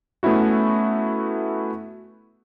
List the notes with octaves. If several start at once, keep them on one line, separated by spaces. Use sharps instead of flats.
A3 B3 C#4 E4 F#4